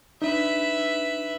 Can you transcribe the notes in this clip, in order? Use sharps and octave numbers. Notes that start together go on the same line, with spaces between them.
D4 D#4 B4 E5